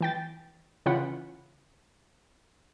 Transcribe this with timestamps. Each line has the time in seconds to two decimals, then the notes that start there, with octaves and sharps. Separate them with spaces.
0.01 E3 G5 A6
0.86 C#3 E3 C#4 F4 F#5 B5